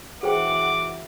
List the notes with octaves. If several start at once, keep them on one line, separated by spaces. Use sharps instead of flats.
E3 F#4 G#4 C5 F#5 G5 D6